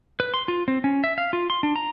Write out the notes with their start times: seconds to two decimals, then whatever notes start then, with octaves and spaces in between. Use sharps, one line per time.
0.20 B4
0.34 C6
0.48 F4
0.68 C4
0.84 C#4
1.04 E5
1.18 F5
1.33 F4
1.50 C6
1.63 D4
1.76 A#5